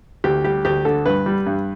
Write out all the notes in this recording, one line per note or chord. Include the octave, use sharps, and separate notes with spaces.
D2 G4
G3 G4
D2 G4
D3 A4
G2 B4
G3
G2